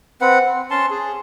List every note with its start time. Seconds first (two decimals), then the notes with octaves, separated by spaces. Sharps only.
0.21 C4 B4 F#5
0.45 C4
0.70 C#4 A5 C6
0.90 G#4